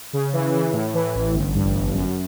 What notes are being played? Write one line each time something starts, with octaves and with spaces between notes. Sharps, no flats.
C#3
E3
E3
A2
E3
A1
G1
G2
G1
F#2